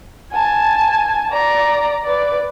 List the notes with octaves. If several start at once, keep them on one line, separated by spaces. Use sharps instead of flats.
G#5 A5
D5 A#5
B4 D5